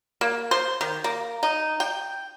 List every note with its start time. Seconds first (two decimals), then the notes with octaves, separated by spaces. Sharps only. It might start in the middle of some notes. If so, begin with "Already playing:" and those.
0.21 A#3
0.51 C5
0.81 D#3
1.04 A#3
1.43 D#4
1.80 G5